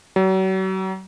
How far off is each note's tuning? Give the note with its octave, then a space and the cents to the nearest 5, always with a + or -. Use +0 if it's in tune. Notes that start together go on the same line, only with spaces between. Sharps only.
F#3 +40